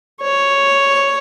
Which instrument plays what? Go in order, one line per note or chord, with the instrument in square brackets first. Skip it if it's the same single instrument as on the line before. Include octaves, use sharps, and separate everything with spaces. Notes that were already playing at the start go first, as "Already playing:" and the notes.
[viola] C#5